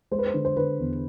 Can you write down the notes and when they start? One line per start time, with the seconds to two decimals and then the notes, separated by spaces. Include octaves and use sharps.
0.11 G#3 C5
0.18 B4
0.26 C5
0.34 D3
0.45 C5
0.57 D3 B4
0.79 E2